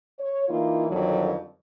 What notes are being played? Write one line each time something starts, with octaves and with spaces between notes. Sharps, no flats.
C#5
E3 A#3 D#4 F4
F2 D3 D#3 F#3 G3